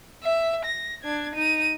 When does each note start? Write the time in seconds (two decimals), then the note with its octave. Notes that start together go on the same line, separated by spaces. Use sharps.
0.23 E5
0.65 A#6
1.03 D4 G#6
1.35 D#4 D#7